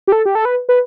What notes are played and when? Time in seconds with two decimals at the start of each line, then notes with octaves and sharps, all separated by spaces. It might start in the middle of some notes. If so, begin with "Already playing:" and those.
0.08 G4
0.12 A4
0.26 G4
0.35 A4
0.45 B4
0.69 B4